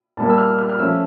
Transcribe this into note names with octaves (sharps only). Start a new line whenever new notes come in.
A#2 G3 A#3 A5
E6
F6
F6
F6
F3 A3 C#4 E6